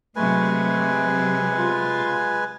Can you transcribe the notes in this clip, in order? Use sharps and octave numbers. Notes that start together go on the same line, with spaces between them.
C3 F#3 G#3 A3 B4 G#5
F4